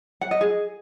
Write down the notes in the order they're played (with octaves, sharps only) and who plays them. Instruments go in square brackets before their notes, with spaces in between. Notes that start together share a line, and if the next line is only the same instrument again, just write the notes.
[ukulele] F#5
D#5
G#4